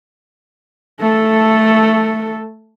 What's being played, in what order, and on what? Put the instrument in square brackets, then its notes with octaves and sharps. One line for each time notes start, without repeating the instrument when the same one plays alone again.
[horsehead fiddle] A3 A4